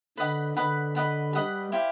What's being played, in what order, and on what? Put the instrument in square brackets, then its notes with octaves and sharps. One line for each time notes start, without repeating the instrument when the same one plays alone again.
[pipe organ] D3 [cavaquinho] B4 D#5 F#5 B5
[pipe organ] D3 [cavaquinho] B4 D#5 F#5 B5
[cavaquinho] B4 D#5 F#5 B5
[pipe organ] G3 [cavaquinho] B4 D#5 F#5 B5
[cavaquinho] E4 G4 C5 F5